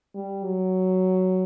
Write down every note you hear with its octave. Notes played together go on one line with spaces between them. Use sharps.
G3
F#3